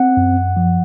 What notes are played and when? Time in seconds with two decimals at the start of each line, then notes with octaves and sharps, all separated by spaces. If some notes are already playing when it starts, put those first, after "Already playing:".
Already playing: C4 F#5
0.17 F#2
0.57 F3